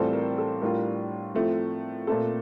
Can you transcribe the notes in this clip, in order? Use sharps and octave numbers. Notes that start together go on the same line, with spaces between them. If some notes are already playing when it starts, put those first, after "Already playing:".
Already playing: A2 E3 G3 C4 F4 A4 C5
A#4
A4
A2 G3 D4 F4 A#4
A2 F3 A3 C4
A#2 A3 C4 A4